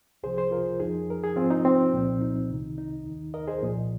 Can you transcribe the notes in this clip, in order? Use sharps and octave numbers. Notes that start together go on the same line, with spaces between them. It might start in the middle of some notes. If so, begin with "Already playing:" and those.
C2 C3 F3 G#4 C5
G#4 C5
F4 A#4
F2 F3 D#4 G#4
A#4
G#4
G#2 F3 C4 F4
D#4
C4
C2 A#2 F3
D#4
C2 C3 D#3
D#4
D#2 D#3
A#4 D#5
G#4 C5
C2 A#2 F3